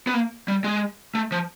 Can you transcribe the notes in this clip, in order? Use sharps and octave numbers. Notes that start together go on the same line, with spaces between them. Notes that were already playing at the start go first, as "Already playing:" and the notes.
B3
A#3
G3
G#3
A3
F3